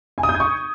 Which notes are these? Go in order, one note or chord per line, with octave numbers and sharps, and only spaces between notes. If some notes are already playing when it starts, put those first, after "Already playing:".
G#5
D#6
G6
G#6
C#6